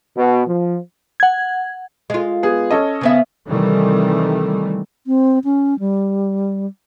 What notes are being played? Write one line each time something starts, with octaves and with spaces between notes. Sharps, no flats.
B2
F3
F#5 G#6
G#3 F4
B3 G#4
C#4 A4 D#5
C#3 B3 E5
C3 D#3 E3 G3 A3
C4
C#4
G3